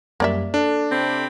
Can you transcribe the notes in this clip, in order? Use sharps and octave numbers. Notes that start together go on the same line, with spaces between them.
F#2 G3 A#3 D5 E5
D4 A4
C3 C4 B5